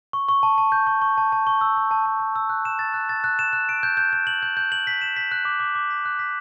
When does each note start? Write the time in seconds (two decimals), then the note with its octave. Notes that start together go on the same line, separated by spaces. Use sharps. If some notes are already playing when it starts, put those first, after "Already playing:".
0.13 C#6
0.29 C#6
0.43 A5
0.58 A5
0.72 G6
0.87 C#6
1.02 C#6
1.18 A5
1.32 A5
1.47 C#6
1.61 E6
1.77 E6
1.91 A5
2.06 A5
2.20 C#6
2.36 E6
2.50 F#6
2.65 E7
2.79 A6
2.94 F#6
3.09 A6
3.24 F#6
3.39 E7
3.53 F#6
3.69 D7
3.83 G6
3.97 G6
4.13 G6
4.27 F#7
4.43 G6
4.57 G6
4.72 F#7
4.87 B6
5.02 E7
5.16 B6
5.31 F#6
5.45 D6
5.60 D6
5.75 D6
5.90 B6
6.05 F#6
6.19 B6